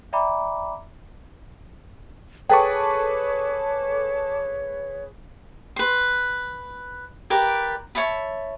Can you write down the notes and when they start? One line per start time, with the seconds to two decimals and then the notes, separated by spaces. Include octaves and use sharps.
0.13 D5 E5 G5 A#5 B5 D6
2.50 G#4 A4 B4 C#5 G5 A5 C#6 D6
5.76 B4 C6
7.30 G4 A#4 B4 D5
7.95 C#5 E5 A5 B5